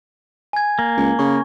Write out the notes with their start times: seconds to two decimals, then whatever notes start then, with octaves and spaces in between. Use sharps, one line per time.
0.53 G#5 G#6
0.79 A#3
0.97 C#2
1.19 C#3 C#6